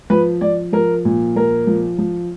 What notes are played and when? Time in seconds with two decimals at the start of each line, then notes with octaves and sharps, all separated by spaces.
0.10 F3 B4
0.41 F3 D5
0.73 F3 A#4
1.05 A#2
1.36 F3 A#4
1.67 F3
1.98 F3